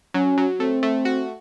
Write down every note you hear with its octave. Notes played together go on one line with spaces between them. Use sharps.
F#3 C#4
F#3
A3 C4
A3
F#4